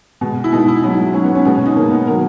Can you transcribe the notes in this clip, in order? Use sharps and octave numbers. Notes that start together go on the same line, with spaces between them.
B2 G#3
E4
B2 G#3 D#4
E4
G#2 F#3 E4
G#2 F#3 C#4
B3
C#4
B2 G#3 B3
C#4
D#4
B2 G#3 A#3
B3
D#3 F#3 A#4